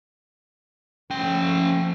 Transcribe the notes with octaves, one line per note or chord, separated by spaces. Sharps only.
F3 A3 C#4 G5